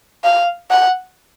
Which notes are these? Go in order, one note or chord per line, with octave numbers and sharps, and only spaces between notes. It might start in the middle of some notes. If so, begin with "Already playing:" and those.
F5
F#5